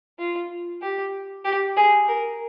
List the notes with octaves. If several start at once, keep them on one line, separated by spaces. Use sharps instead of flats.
F4
G4
G4
G#4
A#4